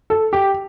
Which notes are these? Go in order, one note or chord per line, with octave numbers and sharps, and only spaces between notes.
A4
G4